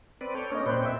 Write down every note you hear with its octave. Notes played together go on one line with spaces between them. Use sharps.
C4 B4 D5
A4 C#5 G5
A#3 C#4 D4 C#5 D#5
A#2 C4 B4 C5 D5 G5
E5